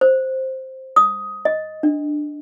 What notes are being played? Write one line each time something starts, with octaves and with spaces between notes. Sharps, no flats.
C5
D#6
D#5
D4